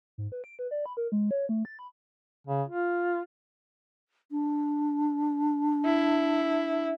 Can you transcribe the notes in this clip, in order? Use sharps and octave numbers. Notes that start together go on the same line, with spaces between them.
G#2
B4
D7
B4
D5
B5
A#4
G#3
C#5
A3
A6
B5
C#3
F4
D4
E4